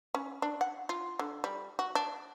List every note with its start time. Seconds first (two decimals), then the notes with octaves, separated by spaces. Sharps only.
0.15 C#4
0.42 D4
0.61 F#5
0.89 F4
1.19 D3
1.44 G3
1.79 F#4
1.95 D4